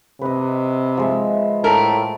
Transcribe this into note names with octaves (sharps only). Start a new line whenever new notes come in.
C3 B4 D#5
F3 G#3 E5
A2 A3 A#4